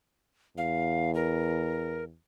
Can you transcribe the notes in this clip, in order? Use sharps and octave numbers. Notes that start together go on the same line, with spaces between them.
E2 F5
A#4